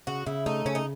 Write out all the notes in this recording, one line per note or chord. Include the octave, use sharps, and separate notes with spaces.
C#3 F#4
C#3 E4
A3 D#4
C#3 C#4
D#4